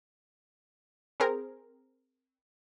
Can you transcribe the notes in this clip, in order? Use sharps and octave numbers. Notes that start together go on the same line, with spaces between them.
C4 G#4 A#4 C5